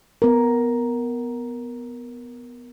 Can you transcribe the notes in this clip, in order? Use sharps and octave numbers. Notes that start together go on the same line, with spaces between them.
B3 A#4